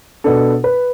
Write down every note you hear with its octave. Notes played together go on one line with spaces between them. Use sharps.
B2 B3 D4 A4
B4